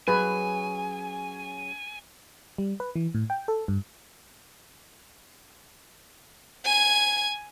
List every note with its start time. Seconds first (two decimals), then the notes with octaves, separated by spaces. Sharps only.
0.08 F#3 C#4 G#4 B4 G#5
2.58 G3
2.80 B4
2.95 E3
3.14 A2
3.30 G5
3.48 A4
3.68 G2
6.65 G#5 G#6